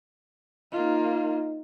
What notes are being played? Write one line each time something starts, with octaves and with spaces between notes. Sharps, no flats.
A#3 D#4 F4 D#5